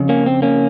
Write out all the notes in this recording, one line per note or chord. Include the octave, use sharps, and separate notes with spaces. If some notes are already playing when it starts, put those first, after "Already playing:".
Already playing: F2 C#3
A#3 C#4
C4
A#3 C#4